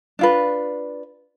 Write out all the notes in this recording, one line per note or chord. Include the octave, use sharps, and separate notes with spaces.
D4 F4 B4